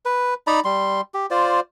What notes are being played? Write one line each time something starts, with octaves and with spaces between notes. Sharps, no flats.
B4
D#4 D5 A#5 B5
G3 C6
G4
F4 C5 D5